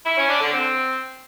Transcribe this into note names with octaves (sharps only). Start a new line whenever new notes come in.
E4
C#4
D4
D3
C4